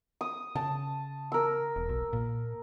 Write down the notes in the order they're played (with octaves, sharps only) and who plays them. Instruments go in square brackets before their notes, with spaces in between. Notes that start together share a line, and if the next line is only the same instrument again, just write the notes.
[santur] D#6
[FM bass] C#3 [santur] A5
[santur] A#4 E6
[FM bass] E1
B1
A#2